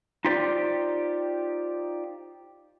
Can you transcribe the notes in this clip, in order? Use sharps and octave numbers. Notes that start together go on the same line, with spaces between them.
D#4 F4 G4 C5 D5